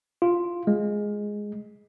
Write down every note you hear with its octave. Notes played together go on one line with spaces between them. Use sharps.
F4
G#3